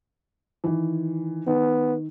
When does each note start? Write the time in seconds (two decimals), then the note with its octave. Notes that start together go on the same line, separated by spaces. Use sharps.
0.64 D#3 E3
1.47 D#3 B3